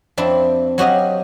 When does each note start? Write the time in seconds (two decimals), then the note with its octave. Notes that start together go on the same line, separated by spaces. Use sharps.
0.17 F2 C4 D4 E4
0.78 F#3 F#4 G4 D#5 F5